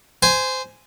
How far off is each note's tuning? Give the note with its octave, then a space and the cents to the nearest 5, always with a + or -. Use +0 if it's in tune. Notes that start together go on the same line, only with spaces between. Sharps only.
C5 -15 G#5 +0